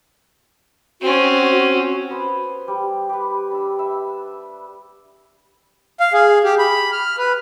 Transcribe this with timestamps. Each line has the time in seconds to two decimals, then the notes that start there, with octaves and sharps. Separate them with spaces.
1.01 C4 C#4 F#4
2.11 B3 C5 G#5
2.68 G3
3.09 G4 B4
3.51 D4 E6
3.79 E5
6.00 F5
6.13 G#4
6.44 G4
6.59 B5
6.92 F6
7.18 B4